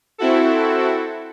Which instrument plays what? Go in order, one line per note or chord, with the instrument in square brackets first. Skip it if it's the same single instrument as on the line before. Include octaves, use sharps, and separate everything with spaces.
[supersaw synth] C4 E4 F#4 A4